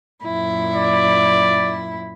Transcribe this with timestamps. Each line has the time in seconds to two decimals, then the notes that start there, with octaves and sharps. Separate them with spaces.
0.24 F#2 A#2 E4
0.75 D5